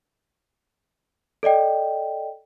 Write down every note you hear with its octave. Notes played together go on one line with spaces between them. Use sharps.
A4 D5 D#5 G5